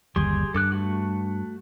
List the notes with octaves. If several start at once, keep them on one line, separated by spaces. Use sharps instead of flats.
G1 D#2 G3 G4 G#4 C6
G2 A4 D6 F#6
A3 F#4